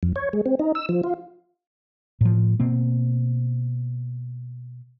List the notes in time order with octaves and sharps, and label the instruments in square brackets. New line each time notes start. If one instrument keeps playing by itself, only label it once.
[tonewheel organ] F2
C#5
G#3
C4
D#4
E6
F3
F4
[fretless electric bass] A2 F3
B2 A#3 C4